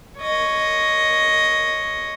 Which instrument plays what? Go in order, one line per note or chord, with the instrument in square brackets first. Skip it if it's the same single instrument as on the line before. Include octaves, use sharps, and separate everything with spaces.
[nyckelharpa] C#5 D#5